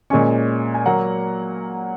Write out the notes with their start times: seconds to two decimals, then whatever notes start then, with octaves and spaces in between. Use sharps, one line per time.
0.10 A#2 G#3 C#4 G#5 C#6
0.74 G#5
0.86 F#3 A#3 F#5 A#5